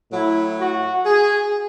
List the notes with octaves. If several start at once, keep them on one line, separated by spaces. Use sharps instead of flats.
A2 F#3 E4
F#4
G#4